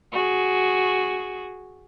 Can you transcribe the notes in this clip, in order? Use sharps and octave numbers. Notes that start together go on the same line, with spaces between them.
F#4 G#4